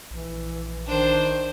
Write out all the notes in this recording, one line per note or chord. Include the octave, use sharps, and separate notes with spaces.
A#1 E3
D#3 D4 C5